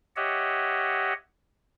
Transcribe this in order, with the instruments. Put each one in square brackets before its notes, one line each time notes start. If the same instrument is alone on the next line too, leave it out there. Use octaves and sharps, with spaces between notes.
[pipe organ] G4 C#5 D#5 E5 F#5